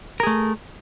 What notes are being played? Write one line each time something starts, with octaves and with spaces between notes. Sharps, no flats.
A3 G#4 A#4